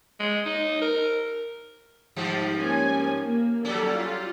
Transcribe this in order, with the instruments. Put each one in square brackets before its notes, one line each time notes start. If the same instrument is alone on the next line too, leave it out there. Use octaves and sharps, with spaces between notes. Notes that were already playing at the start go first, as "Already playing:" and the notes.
[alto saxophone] G#3
D#4
A#4
[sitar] G#2 F3 G3
[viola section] A#3 C#4 G#5
A#3
[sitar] F#3 G3 C#4 [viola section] A4 D5
[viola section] F4